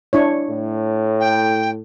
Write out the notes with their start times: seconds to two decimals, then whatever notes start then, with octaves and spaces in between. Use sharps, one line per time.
0.13 D4 E4 C#5
0.50 A2
1.20 G5